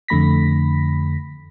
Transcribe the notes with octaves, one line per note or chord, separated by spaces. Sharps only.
F2 D3 A3 B5 A#6 B6